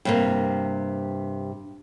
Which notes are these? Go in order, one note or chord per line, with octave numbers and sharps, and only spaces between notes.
G2 C3 A#3